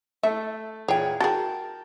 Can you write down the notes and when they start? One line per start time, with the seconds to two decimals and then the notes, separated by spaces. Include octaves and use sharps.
0.23 A3 A4 E5
0.88 E2 A#2 G#4 C#5 G5
1.20 F#4 G#4 A#4 G5 A5